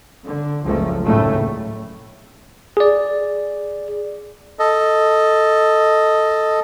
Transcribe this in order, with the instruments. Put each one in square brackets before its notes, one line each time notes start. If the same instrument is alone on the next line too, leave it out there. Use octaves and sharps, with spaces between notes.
[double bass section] D3
F#1 C#2 F3 A3
F#1 D#2 A2 C#3 A3
[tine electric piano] G#4 D5
[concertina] A4 D#5